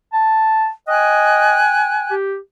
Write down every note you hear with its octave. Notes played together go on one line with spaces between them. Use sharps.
A5
D#5 G5 G#5 F#6
G4